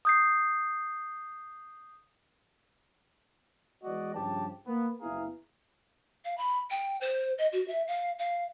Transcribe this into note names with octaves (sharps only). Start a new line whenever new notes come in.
D#6 G6 C7
E3 G#3 B3 F#4 D5 D#5
G2 C#3 F3 G4 A5
A#3 B3
F#1 B3 E4 G#4 F5 A#5
F5
B5
G5
C5
D#5
F#4
E5
F5
F5